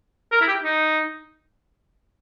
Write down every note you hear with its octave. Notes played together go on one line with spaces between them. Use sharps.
A#4
E4
G4
D#4